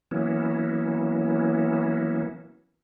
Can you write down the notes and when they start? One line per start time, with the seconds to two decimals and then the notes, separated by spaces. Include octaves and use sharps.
0.11 E3 F#3 A#3 B3 C#4 E4